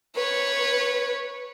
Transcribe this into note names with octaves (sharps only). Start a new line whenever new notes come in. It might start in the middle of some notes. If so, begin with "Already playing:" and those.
B4 C#5